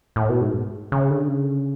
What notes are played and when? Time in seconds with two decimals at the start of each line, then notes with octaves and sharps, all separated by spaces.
0.16 A2
0.29 B2
0.41 G#2
0.92 C#3
1.10 D3
1.28 C#3